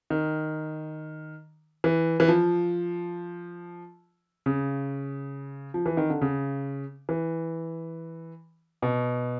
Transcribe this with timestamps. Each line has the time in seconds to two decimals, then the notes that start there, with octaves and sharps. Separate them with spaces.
0.10 D#3
1.84 E3
2.20 E3
2.28 F3
4.46 C#3
5.74 F3
5.86 E3
5.97 D#3
6.10 D3
6.22 C#3
7.09 E3
8.82 B2